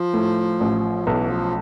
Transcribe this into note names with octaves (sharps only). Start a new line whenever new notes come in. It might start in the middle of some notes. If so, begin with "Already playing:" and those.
Already playing: F3
A2
A1
B1 E3
F3